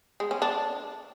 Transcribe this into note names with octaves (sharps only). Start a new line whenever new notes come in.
G#3
C#4
D4